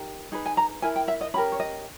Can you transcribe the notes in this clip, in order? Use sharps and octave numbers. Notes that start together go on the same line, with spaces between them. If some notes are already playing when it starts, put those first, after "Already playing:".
Already playing: D#4 G4 A#4
D#4 G#4 B4
G#5
A#5
E4 A#4 G#5
G5
E5
D#5
C#4 G4 A#4 B5
C#5
D#5